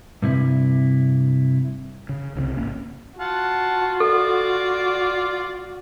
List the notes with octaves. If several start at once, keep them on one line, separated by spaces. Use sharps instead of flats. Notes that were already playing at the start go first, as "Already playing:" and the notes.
G2 C3 E4
C#3
C2 C#3 F#3 C4
G#1 A#3 C#4
F4 F#4 F#5 A5
A4 D5